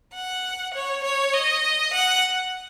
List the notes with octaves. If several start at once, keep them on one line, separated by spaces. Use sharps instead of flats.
F#5
C#5
C#5
D#5
F#5